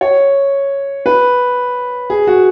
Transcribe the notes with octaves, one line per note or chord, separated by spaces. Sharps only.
C#5
B4
G#4
F#4